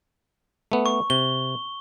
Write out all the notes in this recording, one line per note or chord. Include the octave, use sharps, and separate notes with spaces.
A3 B3
C#6
C3 G7